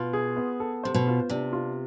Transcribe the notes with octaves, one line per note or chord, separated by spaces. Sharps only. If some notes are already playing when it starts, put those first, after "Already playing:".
Already playing: B2 F4
G#4
B3
A4
C3 C5
B2
F4
C3 D4
F4